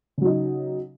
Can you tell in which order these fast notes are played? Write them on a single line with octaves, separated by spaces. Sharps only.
C#3 F#3 D#4